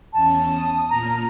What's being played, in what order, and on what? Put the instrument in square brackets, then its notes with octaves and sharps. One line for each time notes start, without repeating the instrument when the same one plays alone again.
[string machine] E2 C#4 [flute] A5
[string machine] D#6
[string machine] A#2 F6 [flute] A#5